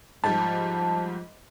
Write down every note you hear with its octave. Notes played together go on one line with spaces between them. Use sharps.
G#2 F3 G3 A5